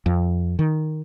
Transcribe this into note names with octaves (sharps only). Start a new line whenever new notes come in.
F2
D#3